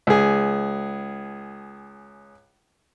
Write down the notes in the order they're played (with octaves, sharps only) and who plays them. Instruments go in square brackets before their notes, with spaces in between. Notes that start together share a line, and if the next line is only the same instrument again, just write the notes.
[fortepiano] C#2 G#4